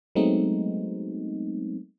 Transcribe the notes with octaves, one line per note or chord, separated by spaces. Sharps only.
F#3 G#3 A3 B3 C4 D#4